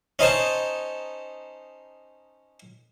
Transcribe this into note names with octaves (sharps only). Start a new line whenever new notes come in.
C#4 D#4 C5 A5